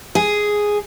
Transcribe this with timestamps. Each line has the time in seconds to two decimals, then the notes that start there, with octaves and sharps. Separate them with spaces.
0.15 G#4